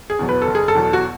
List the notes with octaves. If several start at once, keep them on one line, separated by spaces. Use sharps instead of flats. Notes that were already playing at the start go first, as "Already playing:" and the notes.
G#4
E2 B2 F#3
B4
A4
F#1
G#4
A4
E2 B2 F#3
F#4